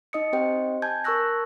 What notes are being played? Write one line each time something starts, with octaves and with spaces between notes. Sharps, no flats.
D#4 D#5 D#6 C#7
C4 G4 C5 D#5 G5
G#5 A5 G6 G#6
A#4 A5 C#6 E6 F#6 A#6